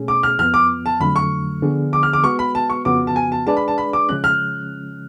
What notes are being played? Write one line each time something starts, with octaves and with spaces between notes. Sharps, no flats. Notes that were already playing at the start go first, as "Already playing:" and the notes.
Already playing: B2 A3 C#4 G#4
D6
F6
F2 F3 B3 F6
D6
A5
F2 D3 F#3 A3 B5
C#6
D3 F3 B3 D4 G#4
D6
F6
D6
G#3 B3 F#4 B4 C#6
B5
A5
C#6
F2 C#3 F3 B3 F#4 D6
A5
G#5
A5
G#3 D4 G#4 B4 D5 A5
B5
A5
B5
D6
C#3 F3 G#3 C#4 F#6
F6